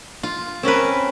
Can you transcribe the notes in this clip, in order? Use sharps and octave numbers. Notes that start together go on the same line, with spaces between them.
F4
C4 C#4 A#4 B4